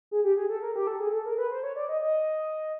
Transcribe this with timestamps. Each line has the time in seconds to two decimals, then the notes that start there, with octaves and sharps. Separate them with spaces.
0.11 G#4
0.24 G4
0.37 G#4
0.49 A4
0.62 A#4
0.76 G4
0.87 A4
1.00 G#4
1.13 A4
1.26 A#4
1.38 B4
1.51 C5
1.63 C#5
1.76 D5
1.89 D#5
2.01 D#5